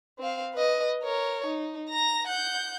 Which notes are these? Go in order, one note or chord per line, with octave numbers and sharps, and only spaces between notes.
C4 F5
B4 D#5
A#4 C#5
D#4
A#5 A#6
F#5 G6